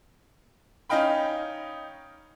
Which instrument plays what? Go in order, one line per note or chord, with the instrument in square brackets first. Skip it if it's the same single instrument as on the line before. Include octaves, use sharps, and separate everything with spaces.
[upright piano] C#4 D#4 D#5 F5 G5 B5